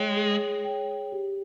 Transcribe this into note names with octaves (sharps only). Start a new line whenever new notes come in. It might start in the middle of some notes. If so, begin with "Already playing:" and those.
Already playing: G#3 G#4 C#5 G5
G#4
C#5 G5
G4